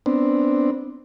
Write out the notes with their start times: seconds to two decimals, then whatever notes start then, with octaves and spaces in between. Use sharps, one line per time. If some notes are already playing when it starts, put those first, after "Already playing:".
0.06 B3 C4 D4